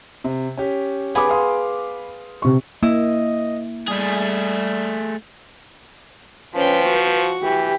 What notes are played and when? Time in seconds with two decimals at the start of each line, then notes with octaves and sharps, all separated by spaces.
0.24 C3
0.58 C#4 G4
1.15 B3 G#4 B5 D6
1.29 F5 C6 D#6
2.42 C3 C#6
2.83 A#3 E4 D#5
3.88 G3 A3 G#4
6.55 F3 C#4 B4 C5 G5
6.85 F#4
7.43 E3 G4